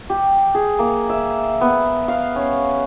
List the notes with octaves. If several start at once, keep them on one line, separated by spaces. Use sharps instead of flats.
G4
G#4
A#3
E5
B3
F5
C#4